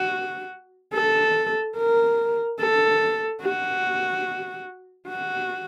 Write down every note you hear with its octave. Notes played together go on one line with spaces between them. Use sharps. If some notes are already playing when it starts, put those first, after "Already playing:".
Already playing: F#4
A4
A#4
A4
F#4
F#4